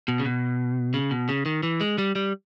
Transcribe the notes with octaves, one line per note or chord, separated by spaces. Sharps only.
B2
C#3
B2
C#3
B2
C#3
D#3
E3
G#3
G3
G3